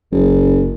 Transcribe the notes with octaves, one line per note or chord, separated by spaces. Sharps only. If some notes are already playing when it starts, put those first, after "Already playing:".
F#1